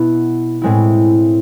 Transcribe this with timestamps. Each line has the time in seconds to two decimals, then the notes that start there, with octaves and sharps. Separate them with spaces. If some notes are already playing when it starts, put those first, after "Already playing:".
Already playing: B2 B3 E4
0.62 A2 G#3 C4 E4